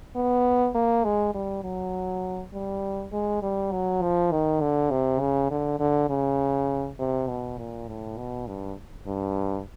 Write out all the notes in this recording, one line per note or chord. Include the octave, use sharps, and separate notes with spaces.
B3
A#3
G#3
G3
F#3
G3
G#3
G3
F#3
F3
D#3
D3
C3
C#3
D3
D3
C#3
C3
B2
A#2
A2
B2
G2
G2